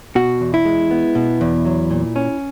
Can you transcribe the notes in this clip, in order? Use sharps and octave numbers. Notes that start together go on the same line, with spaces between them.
B2 F#4
E2
E4
G#3
B3
B2
E2
F#3
A#2
C#4